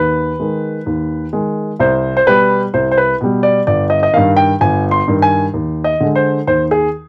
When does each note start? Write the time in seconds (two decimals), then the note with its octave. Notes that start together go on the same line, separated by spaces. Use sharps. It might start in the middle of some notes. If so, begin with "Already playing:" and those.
Already playing: D#2 B4
0.39 D#3 G#3
0.86 D#2
1.33 D#3 G#3
1.80 C2 C5
2.17 C5
2.26 B2 G3 B4
2.74 C2 C5
2.91 C5
2.98 B4
3.21 B2 G3
3.43 D5
3.67 G1 D5
3.90 D#5
4.03 D#5
4.13 G2 D#3 F5
4.37 G5
4.61 G1 G#5
4.91 C6
5.08 G2 D#3
5.22 G#5
5.54 D#2
5.84 D#5
6.00 D3 G#3
6.16 C5
6.47 D#2 C5
6.71 G#4